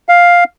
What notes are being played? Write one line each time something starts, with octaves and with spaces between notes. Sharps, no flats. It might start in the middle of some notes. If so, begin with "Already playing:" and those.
F5